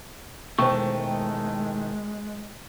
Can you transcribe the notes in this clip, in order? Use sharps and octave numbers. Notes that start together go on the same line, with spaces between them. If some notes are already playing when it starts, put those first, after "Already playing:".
E1 D#3 G#3 A3 C5 G5 C#6